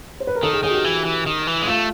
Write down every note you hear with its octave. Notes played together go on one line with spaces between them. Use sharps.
C5
B4
A#4
D#3 A4
G#4
D#3 G#4
F#4
G4
E3
E3
D#3
E3
G#3
A3 F4